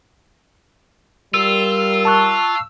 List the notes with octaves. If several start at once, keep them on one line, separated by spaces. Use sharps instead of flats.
G3 F4 A#4 E6
A5 C#6 F#6